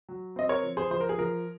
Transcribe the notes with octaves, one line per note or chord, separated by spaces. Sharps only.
F#3
C4 D#5
A#4 C#5
F3
G#4 C5
F3 C5
A#4
G#4
F3 A#4